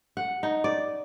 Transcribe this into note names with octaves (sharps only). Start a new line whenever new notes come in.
F#5
D#4
D5